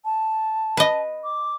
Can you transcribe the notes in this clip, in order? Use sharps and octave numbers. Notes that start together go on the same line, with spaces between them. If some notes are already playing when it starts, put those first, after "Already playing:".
A5
B4 D#5
D6